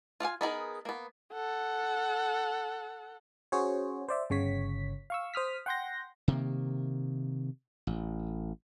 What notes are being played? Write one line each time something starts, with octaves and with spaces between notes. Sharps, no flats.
F4 F5 F#5 G#5
B3 D#4 G#4 A#4
A#3 B3
A4 F#5
C#4 F#4 G#4 C5 C#5
C5 D5 E5
G1 C#3 C#5 B6
F5 C#6 E6
C5 D#6 F6 B6
F#5 G5 C6 G6 A#6
C3 D#3 A#3
A1